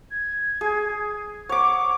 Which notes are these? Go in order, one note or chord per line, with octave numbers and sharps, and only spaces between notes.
G#6
G#4
C#5 F#5 D6